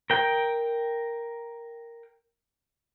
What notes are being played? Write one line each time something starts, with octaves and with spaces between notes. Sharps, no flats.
A#4 G5